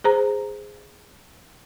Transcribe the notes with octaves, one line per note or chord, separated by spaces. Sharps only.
G#4 C5 A#5